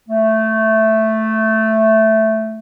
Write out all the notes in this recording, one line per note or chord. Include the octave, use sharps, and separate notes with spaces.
A3